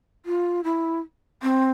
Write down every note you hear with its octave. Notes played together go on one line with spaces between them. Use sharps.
F4
E4
C4